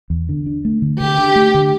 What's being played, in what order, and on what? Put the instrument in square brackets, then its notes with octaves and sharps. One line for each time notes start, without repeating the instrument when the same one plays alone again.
[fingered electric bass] E2
D3
D4
A3
D3
[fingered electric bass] D3 [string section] G4
[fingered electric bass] D4
A3
D3